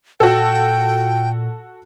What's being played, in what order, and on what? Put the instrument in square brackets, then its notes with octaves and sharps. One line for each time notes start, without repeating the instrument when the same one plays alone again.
[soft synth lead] A#2 [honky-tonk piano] F#4 A4 [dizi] G5